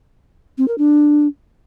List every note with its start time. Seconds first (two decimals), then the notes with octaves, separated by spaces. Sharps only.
0.58 C4
0.68 A#4
0.78 D4